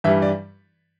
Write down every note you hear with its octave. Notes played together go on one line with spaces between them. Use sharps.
G2 E3 G3 E5
D5